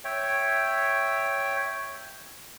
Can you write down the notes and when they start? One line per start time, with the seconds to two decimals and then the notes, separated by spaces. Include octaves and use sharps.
0.04 C#5 E5 G5